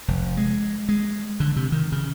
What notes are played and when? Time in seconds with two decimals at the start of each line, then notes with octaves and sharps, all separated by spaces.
0.08 F1
0.37 G#3
0.89 G#3
1.40 D3
1.56 C3
1.72 D#3
1.92 C#3